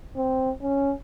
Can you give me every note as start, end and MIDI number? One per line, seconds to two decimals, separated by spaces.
0.16 0.50 60
0.62 0.93 61